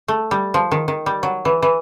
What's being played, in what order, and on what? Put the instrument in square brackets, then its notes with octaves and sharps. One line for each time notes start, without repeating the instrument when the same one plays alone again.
[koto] A3
G3
F3
D#3
D#3
G3
F#3
E3
E3